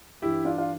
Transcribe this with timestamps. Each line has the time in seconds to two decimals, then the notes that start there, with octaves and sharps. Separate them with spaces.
0.22 G2 E3 E4 G4
0.45 D4 F4
0.58 F4